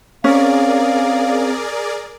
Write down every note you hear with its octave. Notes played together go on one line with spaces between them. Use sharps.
C4 C#4 G#4 A#4 D5 F5